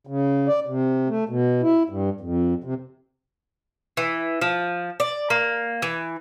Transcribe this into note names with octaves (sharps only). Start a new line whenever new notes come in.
C#3
D5
C3
A3
B2
E4
G2
F2
C3
E3
F3
D5
A#3
E3